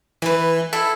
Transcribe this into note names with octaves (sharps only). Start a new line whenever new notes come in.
E3 B4 B5
E4 A4